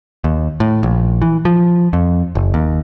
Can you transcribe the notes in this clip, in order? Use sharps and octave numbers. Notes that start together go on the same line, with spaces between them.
D#2
A2
A#1
E3
F3
F2
F#1
D#2